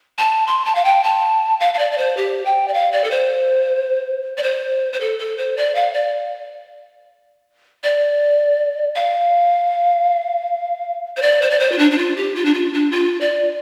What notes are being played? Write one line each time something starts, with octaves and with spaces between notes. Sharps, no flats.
A5
C6
A5
F5
G5
A5
F5
F5
D5
D5
C5
G4
G5
D5
F5
D5
A4
C5
D5
C5
C5
A4
A4
C5
D5
F5
D5
D5
F5
C5
D5
C5
D5
C5
F4
D4
D4
F4
G4
F4
D4
F4
D4
F4
D5